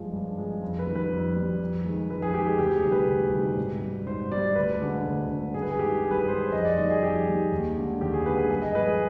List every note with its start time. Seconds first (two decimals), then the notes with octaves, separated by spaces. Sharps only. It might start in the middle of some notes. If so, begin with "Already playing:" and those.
Already playing: G2 F3 G#3
0.12 G2
0.38 F3 G#3
0.61 F2
0.79 B4
0.87 D#3 G3
0.95 B4
1.12 F2
1.36 D#3 G3
1.61 F2
1.85 D#3 G#3
2.10 F2 B4
2.22 G#4
2.34 D#3 G#3 G4
2.47 G#4
2.58 D2 G4
2.76 G#4
2.83 C3 D#3 G3
2.92 B4
3.08 D2
3.33 C3 D#3 G3
3.57 G#2
3.82 G3
4.06 G#2 C5
4.32 G3 D5
4.55 D2 B4
4.80 D3 G#3
5.06 D2
5.30 D3 G#3
5.54 G2 G#4
5.62 B4
5.71 G#4
5.79 D#3 G#3 G4
6.03 G2 G#4
6.11 B4
6.18 G#4
6.28 D#3 G#3 C5
6.52 F2 D#5
6.65 D5
6.77 D#3 G3 D#5
6.90 G#4
7.02 F2 G4
7.27 D#3 G3
7.52 D#2
7.76 D3 G#3
8.01 D#2 G4
8.13 G#4
8.25 D3 G#3 B4
8.38 G#4
8.50 G2 G#4
8.62 D#5
8.75 F3 G#3 B4
8.86 G#4